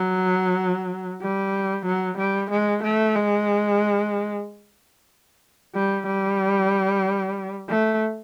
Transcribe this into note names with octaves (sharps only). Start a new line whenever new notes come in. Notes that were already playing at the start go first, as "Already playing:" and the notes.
Already playing: F#3
G3
F#3
G3
G#3
A3
G#3
G3
G3
A3